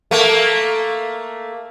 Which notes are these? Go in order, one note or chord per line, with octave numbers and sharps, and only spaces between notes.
A3 A#3